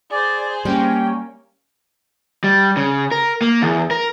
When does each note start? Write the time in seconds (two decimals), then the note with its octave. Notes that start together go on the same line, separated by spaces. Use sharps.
0.10 G#4 C5 D5
0.65 G3 A#3 C#4 G5
2.44 G3
2.77 C#3
3.11 A#4
3.41 A#3
3.62 E2
3.91 A#4